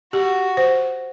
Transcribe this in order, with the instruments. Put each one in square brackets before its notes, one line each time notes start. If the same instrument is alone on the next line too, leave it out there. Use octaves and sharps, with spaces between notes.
[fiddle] F#4 [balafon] G4
[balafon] C5